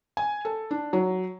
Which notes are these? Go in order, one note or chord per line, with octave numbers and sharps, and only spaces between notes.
G#5
A4
D4
F#3